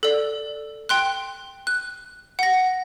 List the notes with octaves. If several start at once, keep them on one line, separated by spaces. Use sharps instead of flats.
A4 D5
G5 C6 F#6
F#6
F#5 A#6